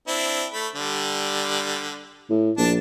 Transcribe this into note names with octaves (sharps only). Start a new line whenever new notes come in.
C4 D4 E4
A3 B5
D3 G3
A2
A#1 D4 A5